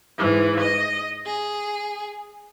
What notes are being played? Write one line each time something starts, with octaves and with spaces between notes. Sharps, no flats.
G#2 E3
D#5
G#4